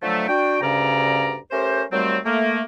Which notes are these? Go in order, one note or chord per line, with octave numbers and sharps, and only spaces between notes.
D3 F3 F#3 A3
D4 F#4 G5
D2 G2 C#3 C#4 D5 A#5
A3 C#4 G4 A#4 C5
D#2 F#3 G3 A3 C4
A3 A#3